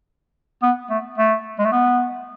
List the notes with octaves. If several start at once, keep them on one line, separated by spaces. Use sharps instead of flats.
B3
A3
A3
G#3
A3
B3